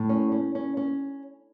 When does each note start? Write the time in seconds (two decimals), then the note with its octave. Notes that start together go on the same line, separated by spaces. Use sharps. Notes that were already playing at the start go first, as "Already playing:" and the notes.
Already playing: A2
0.09 C#4
0.32 C#4
0.55 C#4
0.77 C#4